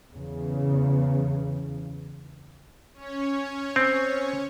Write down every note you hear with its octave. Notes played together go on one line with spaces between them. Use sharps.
E2 C#3
C#4 C#5
C4